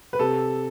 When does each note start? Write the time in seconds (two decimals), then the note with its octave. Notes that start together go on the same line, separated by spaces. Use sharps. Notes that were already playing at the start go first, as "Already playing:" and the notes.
0.13 B4
0.19 C3 A4